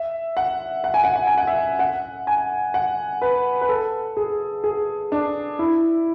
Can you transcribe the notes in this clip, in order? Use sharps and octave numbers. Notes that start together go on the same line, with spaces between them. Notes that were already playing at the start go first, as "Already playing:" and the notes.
Already playing: E5
F#5
F#5
G#5
F#5
F#5
G#5
F#5
E5
F#5
G#5
F#5
B4
B4
A4
G#4
G#4
D4
E4